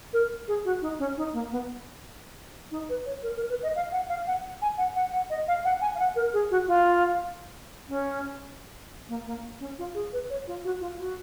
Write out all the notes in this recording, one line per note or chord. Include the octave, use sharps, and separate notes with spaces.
A#4
G#4
F#4
D#4
C#4
D#4
A#3
B3
D#4
B4
C#5
A#4
A#4
B4
D#5
F5
F#5
F5
F#5
G#5
F#5
F#5
F#5
D#5
F5
F#5
G#5
F5
F#5
A#4
G#4
F#4
F4
C#4
A#3
A#3
C#4
F4
G#4
B4
C#5
F4
F#4
F4
F#4